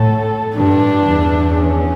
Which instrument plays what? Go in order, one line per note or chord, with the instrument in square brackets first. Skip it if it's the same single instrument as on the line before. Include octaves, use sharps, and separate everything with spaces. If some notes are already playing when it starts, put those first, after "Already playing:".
Already playing: [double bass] A2 [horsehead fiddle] A4
[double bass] G2 [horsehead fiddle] D4
[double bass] E2
[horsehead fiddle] C#4